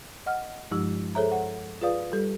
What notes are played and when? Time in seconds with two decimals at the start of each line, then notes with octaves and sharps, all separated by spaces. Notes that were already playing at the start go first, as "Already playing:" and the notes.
0.26 D#5 F#5 F6
0.71 G2 F3 G#3 D#4 G4 E6
1.15 G#4 A4 C5 C#5 E5 A#5
1.32 F#5
1.81 F4 G#4 B4 D5 F5 D#6
2.12 G3 G4 A4